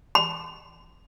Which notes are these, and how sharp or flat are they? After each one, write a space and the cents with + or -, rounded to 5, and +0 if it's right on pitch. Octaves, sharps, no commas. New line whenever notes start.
C6 -35